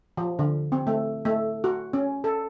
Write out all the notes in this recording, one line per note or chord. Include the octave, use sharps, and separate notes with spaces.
F3
D3
C4
A3
A3
F#4
C#4
A4